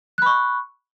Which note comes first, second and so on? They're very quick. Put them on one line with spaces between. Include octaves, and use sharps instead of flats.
F#6 B5 C#6